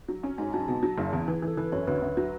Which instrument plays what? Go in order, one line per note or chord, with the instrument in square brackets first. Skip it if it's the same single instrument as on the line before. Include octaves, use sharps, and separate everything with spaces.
[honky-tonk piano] F#3
C#4
[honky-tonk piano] G#2 [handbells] G#5
[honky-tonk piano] F#3 [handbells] A5
[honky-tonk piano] B2 [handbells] A5
[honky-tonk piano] F#3
F#1
E2
E3
E3
[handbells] A4
[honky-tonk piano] E3 [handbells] B4
[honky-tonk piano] F#2 [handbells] C#5
[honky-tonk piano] D2 [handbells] B4
[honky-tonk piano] D2
F#3